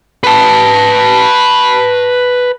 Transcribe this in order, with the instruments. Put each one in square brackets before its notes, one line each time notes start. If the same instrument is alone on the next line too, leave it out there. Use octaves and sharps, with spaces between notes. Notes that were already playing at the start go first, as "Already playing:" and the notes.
[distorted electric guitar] B4 A5